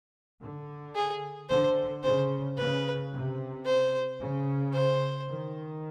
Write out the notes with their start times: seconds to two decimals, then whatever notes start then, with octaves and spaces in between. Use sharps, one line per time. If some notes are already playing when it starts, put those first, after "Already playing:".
0.41 D3
0.96 G#4
1.49 D3 C5
2.03 C#3 C5
2.57 C#3 B4
3.11 C3
3.65 C5
4.20 C#3
4.73 C5
5.28 D#3